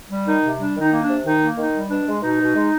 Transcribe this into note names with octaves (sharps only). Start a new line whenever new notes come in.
G3
D#3 D#4
C3
G3 D4
D#3
D#4
A#3
D4
C3
D#3 D#4
A#3
D#3 D#4
G3
B2 D4
G#3
B2 D#4
B2
G#3